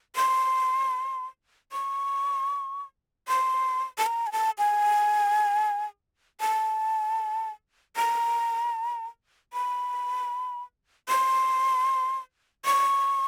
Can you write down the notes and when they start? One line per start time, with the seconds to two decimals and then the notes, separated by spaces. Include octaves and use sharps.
0.16 C6
1.72 C#6
3.28 C6
3.98 A5
4.07 A#5
4.27 G#5
4.32 A5
4.58 G#5
6.41 A5
7.97 A#5
9.53 B5
11.09 C6
12.65 C#6